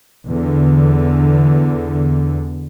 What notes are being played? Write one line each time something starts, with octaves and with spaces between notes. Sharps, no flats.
E2 D3